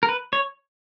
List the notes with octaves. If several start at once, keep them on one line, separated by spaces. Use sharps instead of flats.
A#4
B4
C#5